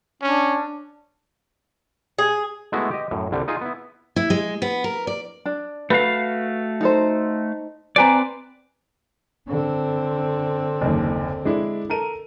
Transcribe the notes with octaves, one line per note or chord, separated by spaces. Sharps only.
C#4 D4
G#4
G#3 A3 B3 E4 F#4
G4 D#5
F#2 A2
C2 D3 G3
D#4 F4 G#4
B3 E4
E4
G#3
B3
A#4
D5
D4
A3 F#4 B4 F5
D#4 A4 C5
C4 B4 C5 D5 G#5 A#5
D3 C4
F#1 D#2
G#3 D4 E4
A4 A#4 D#7